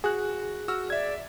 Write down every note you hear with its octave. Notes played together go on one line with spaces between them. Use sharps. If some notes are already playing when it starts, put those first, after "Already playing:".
F#4 G#4 F#6
F#4 E6 F6
D5 E5 G#6